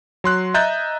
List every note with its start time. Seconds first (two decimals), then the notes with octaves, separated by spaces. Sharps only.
0.24 F#3 C6 F#6
0.54 D#5 E5 A#5 F#6 G6 A6